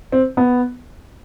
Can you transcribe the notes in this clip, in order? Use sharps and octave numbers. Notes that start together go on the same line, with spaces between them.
C4
B3